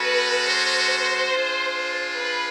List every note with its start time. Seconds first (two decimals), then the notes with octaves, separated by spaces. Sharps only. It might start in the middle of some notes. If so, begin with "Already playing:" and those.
Already playing: G#3 C#4 F#4 A4 B4
0.47 C5
1.31 D4 F4 G#4
2.17 B4